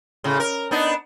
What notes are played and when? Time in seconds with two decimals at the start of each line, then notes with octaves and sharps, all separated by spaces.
0.24 A2 C#3
0.40 A#4
0.71 B3 D4 D#4